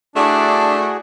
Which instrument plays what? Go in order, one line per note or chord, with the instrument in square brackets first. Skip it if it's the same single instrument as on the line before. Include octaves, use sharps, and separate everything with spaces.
[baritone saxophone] A3 [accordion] D4 [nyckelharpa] E4 D5 [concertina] F#4 G#4